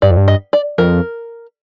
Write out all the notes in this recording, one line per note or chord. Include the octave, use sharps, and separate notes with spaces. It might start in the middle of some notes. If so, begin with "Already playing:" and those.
G2 D5
F2
G2
D#5
D5
F2 A#4